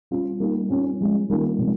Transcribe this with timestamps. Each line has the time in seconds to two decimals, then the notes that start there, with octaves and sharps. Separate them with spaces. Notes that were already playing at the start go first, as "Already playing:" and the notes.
0.11 G3 C#4 F4
0.40 G3 A#3 D#4
0.70 G3 C#4 F4
1.00 F3 G#3 C#4
1.29 D#3 G3 A#3 C#4 F4
1.58 C3 F3 G#3